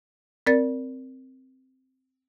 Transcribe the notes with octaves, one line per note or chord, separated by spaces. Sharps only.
C4 A#4 D5 A6